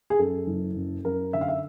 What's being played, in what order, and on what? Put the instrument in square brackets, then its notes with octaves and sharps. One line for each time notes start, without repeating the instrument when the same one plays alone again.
[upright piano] G#4
F#2 A4
F#1
F#2
F#2 A#4
D3 E5
F5
E5